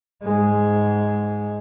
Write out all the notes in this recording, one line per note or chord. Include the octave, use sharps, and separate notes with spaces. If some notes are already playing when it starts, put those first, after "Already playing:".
G#2 G#3